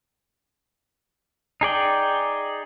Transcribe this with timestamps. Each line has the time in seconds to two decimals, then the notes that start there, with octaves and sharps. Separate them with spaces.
1.61 D#4 G#4 D5 G5